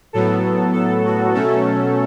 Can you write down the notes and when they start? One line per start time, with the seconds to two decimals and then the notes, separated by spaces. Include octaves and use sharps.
0.13 A2 F#3 B3 A4
0.73 A4
1.05 F#4
1.34 B2 F#3 A3 C#4 A4